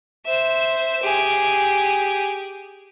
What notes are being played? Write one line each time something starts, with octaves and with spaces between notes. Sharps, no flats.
C5 E5
G4 G#4